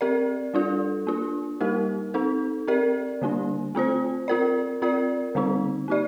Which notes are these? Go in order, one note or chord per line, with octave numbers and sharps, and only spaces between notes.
C4 G4 A#4 D5
G3 D4 F4 A4
A#3 D4 F4
G3 A#3 D#4 G4 A#4
C4 D#4 A4
C4 G4 A#4 D5
D3 G3 A#3 D4
A3 C4 F4 C5
C4 F4 A#4 D5
C4 F4 A#4 D5
D3 G3 C4 D#4
A#3 D#4 G4 D5